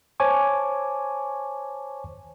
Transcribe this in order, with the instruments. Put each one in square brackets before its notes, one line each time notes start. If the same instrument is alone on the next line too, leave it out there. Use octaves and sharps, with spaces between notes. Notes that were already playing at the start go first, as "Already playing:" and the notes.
[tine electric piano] C5 C#5 G#5 A5 C#6 D6